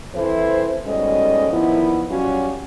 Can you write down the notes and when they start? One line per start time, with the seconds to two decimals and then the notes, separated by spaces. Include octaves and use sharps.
0.14 E3 C4 E4 A4 C5
0.86 G#2 B2 G3 C#4 A4 D#5
1.51 A#2 D#3 F3 B3 E4
2.09 F#3 G3 C#4 F4 F#4